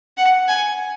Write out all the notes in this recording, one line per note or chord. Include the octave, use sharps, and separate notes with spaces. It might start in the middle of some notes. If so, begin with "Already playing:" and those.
F#5
G#5